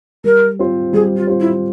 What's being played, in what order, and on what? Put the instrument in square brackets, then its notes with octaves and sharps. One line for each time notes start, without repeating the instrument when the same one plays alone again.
[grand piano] G3 [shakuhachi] A#4
[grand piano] C4 F4 C5
[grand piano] G3 [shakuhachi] G#4
[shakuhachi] F4
[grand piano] C4 F4 C5
[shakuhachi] E4